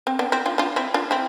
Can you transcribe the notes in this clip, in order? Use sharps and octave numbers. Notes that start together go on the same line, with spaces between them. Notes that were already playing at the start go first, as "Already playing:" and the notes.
C4
B3 D4
C4 E4
D4 F4
D4 F4
C4 E4
D4 F4
C4 E4